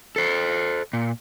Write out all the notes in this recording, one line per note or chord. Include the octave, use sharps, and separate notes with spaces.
A4 C5
A#2